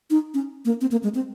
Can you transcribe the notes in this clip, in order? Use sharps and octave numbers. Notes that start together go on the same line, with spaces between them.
D#4
C#4
A#3
C4
A#3
G#3
C4